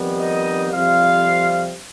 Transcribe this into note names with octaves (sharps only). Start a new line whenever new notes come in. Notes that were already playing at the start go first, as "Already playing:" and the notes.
Already playing: F2 D#3 G3 B3
D#4 D#5
F2 C3 G3 F4 F5